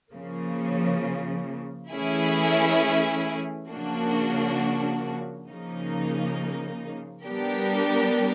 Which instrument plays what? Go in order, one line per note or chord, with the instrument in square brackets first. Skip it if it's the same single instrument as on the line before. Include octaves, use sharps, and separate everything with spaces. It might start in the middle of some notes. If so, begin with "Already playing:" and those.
[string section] C#3 F3 A#3
E3 A3 C#4 E4 G#4
C#3 F3 A#3 D4 F#4
C#3 F3 A#3 D#4
G3 B3 D4 G4 A#4